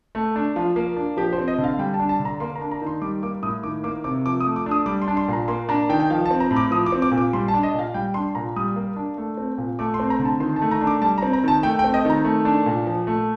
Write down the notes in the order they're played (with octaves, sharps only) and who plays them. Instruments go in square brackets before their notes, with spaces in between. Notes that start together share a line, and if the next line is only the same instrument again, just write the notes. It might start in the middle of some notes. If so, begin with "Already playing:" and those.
[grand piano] A3
D4
F3 F4
A#3
D4
F3 G4
C5
C4
D#5
D3
F5
G3 G5
A5
D4
A5
D3
A#5
A#3 C6
A#5
D4
A#5
D#3
C6
G3 D6
A#3 D6
A2 D#6
D#3 D6
A#3 D6
C3 D6
F3 D6
D#6
A3
D6
D4
D#6
G3 D6
C6
D4
C6
A#2 A#5
A#3 C6
D4 A#5
D#3 G5
G5
F3 F5
A5
C4
A#5
A2
D6
F3 D#6
D6
C4
D6
A#2
D6
G3 C6
A5
D4
D#5
A#2
F5
G3 G5
D4 C6
A#2 A#5
G3 D#6
A#3
D4
A3
C4
A#2
A3 D6
C6
C4
A#5
D3
A5
D#3 C6
A5
A3
A#5
D4
D6
G3 A5
A#5
C4
A#5
D#3 A5
A3 G5
G5
C4
D#5
D#3 A#5
A3
D4
A#2
F3
A3